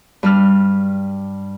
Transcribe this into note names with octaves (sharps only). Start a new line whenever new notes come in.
G2 G3 F6